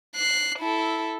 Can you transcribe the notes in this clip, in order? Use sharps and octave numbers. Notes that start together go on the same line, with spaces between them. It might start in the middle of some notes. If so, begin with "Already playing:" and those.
F#6 C7
E4 A4